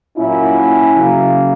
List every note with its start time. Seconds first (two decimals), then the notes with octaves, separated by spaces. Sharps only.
0.18 A#2 F#3 A#3 C#4 E4
0.96 C#3 F#3 A#3